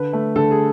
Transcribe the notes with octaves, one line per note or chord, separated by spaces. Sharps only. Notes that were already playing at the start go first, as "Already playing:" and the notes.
Already playing: D3 B4
A3
D3 A4
G#4